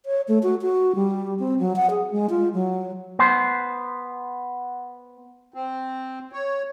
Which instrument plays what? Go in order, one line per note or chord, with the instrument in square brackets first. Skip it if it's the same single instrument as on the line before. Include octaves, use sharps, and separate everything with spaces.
[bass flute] C#5
A3
F#4
F#4
G3
C4
F#3
F#5
G#4
G#3
F4
F#3
[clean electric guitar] B3 C5
[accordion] C4
C#5